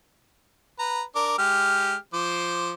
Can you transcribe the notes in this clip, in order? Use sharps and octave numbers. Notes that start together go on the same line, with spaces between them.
B4 A#5
D4 A#4 D6
G#3 G4 F6
F3 C5 D6